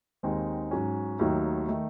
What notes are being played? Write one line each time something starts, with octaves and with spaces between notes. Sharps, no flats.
D#2 D#3 G#3 C4 D#4
G#2 F#3 C#4
D#2 D#3 F#3 A3 D#4
D#3 A3 D#4